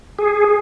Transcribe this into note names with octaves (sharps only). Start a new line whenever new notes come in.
G#4